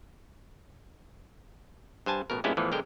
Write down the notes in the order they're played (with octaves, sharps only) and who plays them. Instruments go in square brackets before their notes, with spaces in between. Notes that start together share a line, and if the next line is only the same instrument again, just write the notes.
[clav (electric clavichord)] G2 C5 G#5 A5
A1 B2 A#4
G2 A#2 G#3 B3 C#4 E4
E2 A2 E3 F3
B1 D3 G#3 A#4 G5